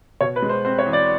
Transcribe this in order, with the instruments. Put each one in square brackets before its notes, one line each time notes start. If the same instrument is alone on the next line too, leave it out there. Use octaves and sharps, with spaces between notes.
[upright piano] B2 C#5
B4
G#3
C5
C4 C5
C#5
E2
D5